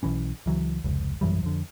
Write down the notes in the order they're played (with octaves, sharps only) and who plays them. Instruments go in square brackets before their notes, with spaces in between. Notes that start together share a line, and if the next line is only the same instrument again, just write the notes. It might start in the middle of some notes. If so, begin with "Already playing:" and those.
[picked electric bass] B1 E3 C#4
C#2 E3 F#3
F1 C#2
A#1 F#2 E3 G3
F2 D3